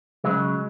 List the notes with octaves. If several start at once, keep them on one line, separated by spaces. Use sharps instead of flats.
C#3 F#3 G#3